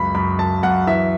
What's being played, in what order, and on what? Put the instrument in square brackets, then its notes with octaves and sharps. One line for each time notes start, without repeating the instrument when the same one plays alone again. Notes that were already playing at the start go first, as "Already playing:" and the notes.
Already playing: [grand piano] C#2 F#2 B5
F#2 B5
F#2 A5
F#2 F#5
E3 E5